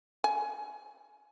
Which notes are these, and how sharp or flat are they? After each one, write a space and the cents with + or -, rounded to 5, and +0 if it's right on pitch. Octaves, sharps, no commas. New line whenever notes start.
G#5 +25